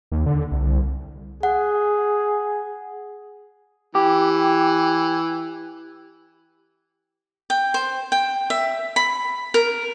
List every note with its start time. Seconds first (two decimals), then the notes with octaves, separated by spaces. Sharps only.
0.12 D#2
0.26 D3
0.52 C2
1.43 G#4 F#5
3.95 E3 G4
7.50 G5
7.74 C5
8.12 G5
8.50 E5
8.96 B5
9.54 A#4